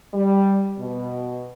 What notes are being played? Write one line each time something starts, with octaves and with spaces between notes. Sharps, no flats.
G3
B2